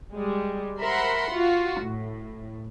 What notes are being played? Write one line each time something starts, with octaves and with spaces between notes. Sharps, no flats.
G3 G#3
A#4 C5 E5 F#5 B5 C6
F4 F#4
A2